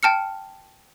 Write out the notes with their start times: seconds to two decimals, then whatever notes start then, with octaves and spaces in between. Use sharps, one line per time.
0.03 G5 A5 F6 C#7